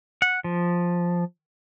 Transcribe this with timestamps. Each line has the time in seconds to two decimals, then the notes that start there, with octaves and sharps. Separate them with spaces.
0.22 F#5
0.44 F3